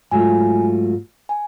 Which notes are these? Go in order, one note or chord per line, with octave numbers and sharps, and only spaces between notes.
G#2 F#3 A3 F4 G#5
G#5